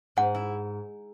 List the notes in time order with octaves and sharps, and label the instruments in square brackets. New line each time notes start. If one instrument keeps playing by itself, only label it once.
[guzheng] G#2 [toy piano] F#5
[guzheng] E4